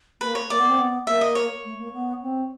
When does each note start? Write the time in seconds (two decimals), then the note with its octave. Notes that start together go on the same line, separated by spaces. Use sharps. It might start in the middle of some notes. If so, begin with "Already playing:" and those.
0.21 A#3 B4
0.35 C#5
0.50 A#3 D5
0.59 B3
0.68 C4
0.78 B3
1.07 A#3 E5
1.21 D#5
1.35 C#5
1.64 A3
1.79 A#3
1.93 B3
2.22 C4